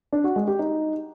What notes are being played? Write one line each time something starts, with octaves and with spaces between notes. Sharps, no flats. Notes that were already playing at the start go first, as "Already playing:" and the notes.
D4
F#4
G#3
G4
D#4